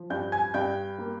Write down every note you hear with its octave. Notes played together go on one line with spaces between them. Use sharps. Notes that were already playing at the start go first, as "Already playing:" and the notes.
Already playing: F3
G2 G5 G6
G#5 G#6
G2 G5 G6
A#3